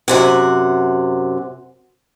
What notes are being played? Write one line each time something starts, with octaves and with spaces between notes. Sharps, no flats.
F#2 C3 F#5